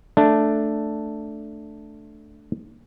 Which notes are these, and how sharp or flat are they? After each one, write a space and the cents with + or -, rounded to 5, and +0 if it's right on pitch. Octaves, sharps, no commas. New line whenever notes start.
A3 +0 D4 +0